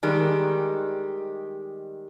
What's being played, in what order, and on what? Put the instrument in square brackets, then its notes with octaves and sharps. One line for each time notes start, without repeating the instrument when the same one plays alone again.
[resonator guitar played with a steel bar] D#3 G3 G#3